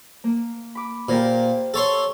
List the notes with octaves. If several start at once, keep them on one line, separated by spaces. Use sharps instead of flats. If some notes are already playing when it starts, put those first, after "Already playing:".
A#3
B5 D6
A#2 G4 A#4 C5
A4 C#5 C6